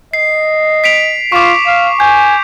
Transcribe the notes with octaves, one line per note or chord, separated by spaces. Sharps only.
D#5 C7
B6 D7 F7
F4 C#6 D6
F5
G#5 G6